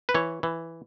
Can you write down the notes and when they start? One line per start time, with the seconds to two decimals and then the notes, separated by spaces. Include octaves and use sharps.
0.09 B4
0.15 E3 C#5
0.43 E3